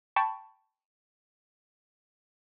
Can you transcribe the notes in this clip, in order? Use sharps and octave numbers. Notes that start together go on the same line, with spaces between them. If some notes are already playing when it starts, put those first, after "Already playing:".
G5 A5 B5 C#6